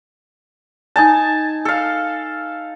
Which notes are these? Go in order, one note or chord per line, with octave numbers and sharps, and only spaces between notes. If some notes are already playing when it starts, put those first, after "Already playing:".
D#4 G#5 A5
A4 F5